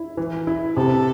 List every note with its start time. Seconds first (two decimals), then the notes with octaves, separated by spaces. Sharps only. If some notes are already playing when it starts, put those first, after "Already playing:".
Already playing: E4
0.17 E3
0.47 E4
0.77 C3 A4